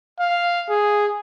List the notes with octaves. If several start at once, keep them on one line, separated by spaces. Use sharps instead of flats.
F5
G#4